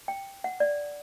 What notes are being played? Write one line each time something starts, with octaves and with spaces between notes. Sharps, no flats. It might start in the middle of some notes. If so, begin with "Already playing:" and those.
G5
F#5
D5